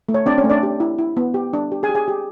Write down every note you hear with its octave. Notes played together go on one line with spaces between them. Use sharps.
A3
C#5
C4 D4 D5
C#4 C#5
A3
D4 D5
G4
E4
E4
B3
G4
D4
G4
G#4 G#5
G4
G#4 G#5
G4